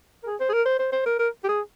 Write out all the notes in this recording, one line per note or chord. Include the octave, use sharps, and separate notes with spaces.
A#4
G#4
C5
G#4
A#4
C5
C5
C5
A#4
A#4
G4
G#4